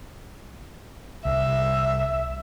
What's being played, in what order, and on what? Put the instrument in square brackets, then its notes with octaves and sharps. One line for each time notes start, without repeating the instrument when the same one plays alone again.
[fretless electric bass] C2 [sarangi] E5